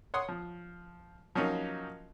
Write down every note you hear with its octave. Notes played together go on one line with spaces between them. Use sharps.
C#5 F#5 C6 D#6
F3
F3 F#3 A#3 C#4 D#4 F4